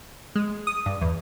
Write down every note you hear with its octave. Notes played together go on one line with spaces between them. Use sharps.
G#3
D#6
G2
E2